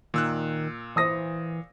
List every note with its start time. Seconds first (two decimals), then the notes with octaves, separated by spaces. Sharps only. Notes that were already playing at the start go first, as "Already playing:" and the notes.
0.14 A#2 D#3 E6 F#6
0.96 E3 C5 D#6 A#6